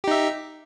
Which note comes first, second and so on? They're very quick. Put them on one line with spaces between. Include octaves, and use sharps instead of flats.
G4 D#4 E5